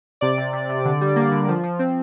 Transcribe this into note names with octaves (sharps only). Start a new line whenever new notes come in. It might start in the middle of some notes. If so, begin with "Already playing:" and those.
C3 D5
C3
C3
C3
D3
G3
A#3
D3
F3
F3
C4